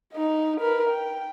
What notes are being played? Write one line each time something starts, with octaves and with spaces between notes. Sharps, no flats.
D#4 D#5
A#4 B4
G5